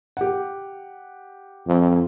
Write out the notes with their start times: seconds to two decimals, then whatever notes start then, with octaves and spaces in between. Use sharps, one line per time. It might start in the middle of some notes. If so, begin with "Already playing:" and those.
0.17 G4 F#5
1.66 F2